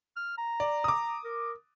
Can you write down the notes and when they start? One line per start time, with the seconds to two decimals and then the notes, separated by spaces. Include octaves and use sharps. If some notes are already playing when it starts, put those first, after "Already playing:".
0.16 F6
0.38 A#5
0.60 D5
0.84 D6 D#6
1.24 A#4